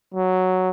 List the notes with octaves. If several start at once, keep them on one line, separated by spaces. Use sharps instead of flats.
F#3